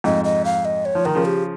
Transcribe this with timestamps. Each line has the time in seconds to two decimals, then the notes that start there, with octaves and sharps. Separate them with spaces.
0.04 F2 G#2 D#5
0.24 D#5
0.45 F5
0.65 D#5
0.85 C#5
0.95 F3
1.05 D#3 A#4
1.15 C#3 F3
1.25 G4